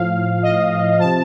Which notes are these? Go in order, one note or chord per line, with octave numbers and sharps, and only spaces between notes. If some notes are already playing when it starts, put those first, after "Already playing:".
Already playing: A2 F3 F5
D#5
C3 F3 A5